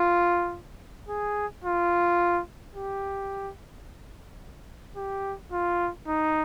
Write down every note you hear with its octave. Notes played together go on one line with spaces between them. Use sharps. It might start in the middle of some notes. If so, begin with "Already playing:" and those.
Already playing: F4
G#4
F4
G4
G4
F4
D#4